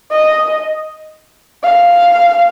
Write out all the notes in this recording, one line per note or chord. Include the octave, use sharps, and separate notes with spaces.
D#5
F5